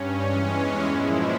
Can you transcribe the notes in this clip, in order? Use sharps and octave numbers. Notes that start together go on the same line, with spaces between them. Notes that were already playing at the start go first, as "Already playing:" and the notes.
Already playing: G2 C#4
E2 E3 G#3 C#4
A#2 F3 G#3 E4